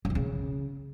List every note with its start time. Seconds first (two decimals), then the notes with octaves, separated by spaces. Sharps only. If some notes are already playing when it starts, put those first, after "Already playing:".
0.05 E3
0.10 D#3
0.15 C#3